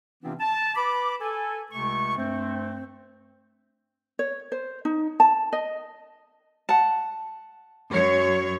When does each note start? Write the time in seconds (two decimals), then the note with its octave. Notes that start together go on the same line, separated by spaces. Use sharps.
0.23 C3 E3 B3 C4 D4 F4
0.40 A5
0.76 B4 B5 D6
1.21 A4 G#5
1.71 C#2 C3 A3 C#6
2.17 G2 A3 C4
4.19 C#5
4.52 C5
4.85 D#4
5.20 A5
5.53 D#5
6.69 F#5 A5
7.91 F#2 C#5